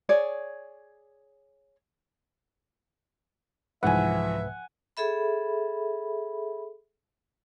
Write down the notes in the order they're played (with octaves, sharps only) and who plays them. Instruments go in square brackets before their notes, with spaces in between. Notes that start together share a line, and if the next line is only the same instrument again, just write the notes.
[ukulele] G#4 C#5 D5
[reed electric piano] C2 G#2 B4 [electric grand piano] E3 F3 [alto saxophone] E5 [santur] F#5 G#5
[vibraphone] G#4 A4 E5 B5